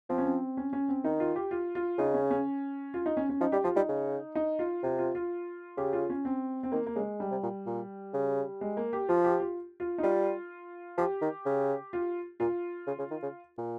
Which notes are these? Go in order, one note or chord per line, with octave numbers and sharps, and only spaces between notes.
F3 C4
C#4
C4
C#4
C#4
C4
D#3 D#4
F4
G4
F4
F4
C#3 D#4
C#4
C#4
F4
D#4
C#4
C#4
F3 D#4
G3 G4
F3 F4
G3 D#4
C#3
D#4
F4
C3 F4
F4
F4
C#3 G4
F4
C#4
C4
C4
D#3 A#3
A#3
C#3 G#3
G3
C3
A#2
A#2
C#3
G#3
A#3
G4
F3 F4
G4
F4
F4
D#4
G3 F4
F3 G4
D#3
C#3
F4
A#2 F4
C#3
C#3
D#3
C#3
A#2